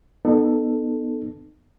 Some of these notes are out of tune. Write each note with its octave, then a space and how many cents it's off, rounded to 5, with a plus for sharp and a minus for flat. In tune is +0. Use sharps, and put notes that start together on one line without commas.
B3 +0 D#4 -35 A4 +0